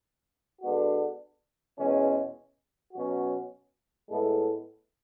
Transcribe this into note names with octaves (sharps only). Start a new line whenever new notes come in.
D3 G#3 B3 D4 F#4
E2 B2 G#3 C#4
B2 F#3 C#4 F#4
A2 G#3 B3 E4 A4